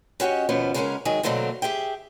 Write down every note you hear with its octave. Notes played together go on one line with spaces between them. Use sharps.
C#4 F#4 G4 C#5 D#5
D#2 B2 F3 B3 C#4
C#3 G#3 A3 B3 C#4 A#4
D#3 F#3 G#3 G#4
B2 D3 F#3 A3 A#3 C4
G4 G#4 E5 G5